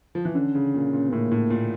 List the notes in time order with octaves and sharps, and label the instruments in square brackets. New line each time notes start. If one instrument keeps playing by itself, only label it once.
[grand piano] F3
E3
[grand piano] D3 [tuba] C#4
[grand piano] C#3
A#2
A#2
[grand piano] A2 [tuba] A#3
[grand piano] A2
A#2